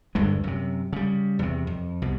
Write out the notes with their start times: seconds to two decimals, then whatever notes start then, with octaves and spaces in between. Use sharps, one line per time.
0.15 D2 G2 D3 G#3
0.44 F#2 C3
0.93 C#3 G3
1.39 E2 C3
1.67 F2
2.02 C2 B2